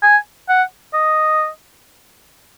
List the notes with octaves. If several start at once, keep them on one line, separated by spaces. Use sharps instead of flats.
G#5
F#5
D#5